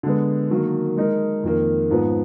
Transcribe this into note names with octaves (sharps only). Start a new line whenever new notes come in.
D3 G#3 B3
D#3 F#3 A#3
G#3 D#4 A#4
F2 D#3 A#3
G#2 F3 B3